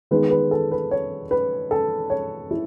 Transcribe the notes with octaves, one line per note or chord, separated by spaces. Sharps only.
D#3 G#3 B3 B4
B4
A4
B4
C#5
B4
A4
C#5
E4